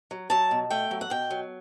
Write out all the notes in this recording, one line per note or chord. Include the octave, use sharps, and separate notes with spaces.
F#3
F#3 A5
B2
A3 G5
F#3
F#5
B2 G5
F#3